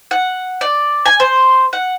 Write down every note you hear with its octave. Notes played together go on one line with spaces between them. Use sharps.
F#5
D5
G#5
C5
F#5